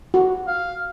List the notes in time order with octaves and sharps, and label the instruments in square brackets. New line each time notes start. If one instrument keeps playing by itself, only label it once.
[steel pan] F#4
[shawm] F5